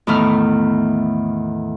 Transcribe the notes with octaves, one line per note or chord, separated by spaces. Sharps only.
E2 A2 D#3 A3 E4 F6